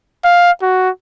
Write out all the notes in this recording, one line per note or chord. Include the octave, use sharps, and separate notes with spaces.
F5
F#4